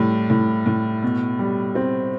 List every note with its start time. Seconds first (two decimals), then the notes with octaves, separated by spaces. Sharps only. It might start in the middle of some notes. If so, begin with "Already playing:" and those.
Already playing: A2 G3
0.30 A2
0.66 A2
1.03 B2
1.39 G3
1.75 C4